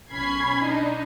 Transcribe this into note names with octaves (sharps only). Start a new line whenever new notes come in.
B1 C#4 B5 G#6 C7
D4 D#4 D#5